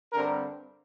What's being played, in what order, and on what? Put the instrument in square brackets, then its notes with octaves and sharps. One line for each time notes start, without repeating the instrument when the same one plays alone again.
[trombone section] G2 D3 G3 C4 A#4